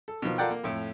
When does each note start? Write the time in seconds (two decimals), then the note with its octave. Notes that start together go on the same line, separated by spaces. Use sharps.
0.08 A4
0.22 B2 D#3 F3
0.38 F4 A4 A#4 D5 F#5 G5
0.51 A#3
0.64 F2 A2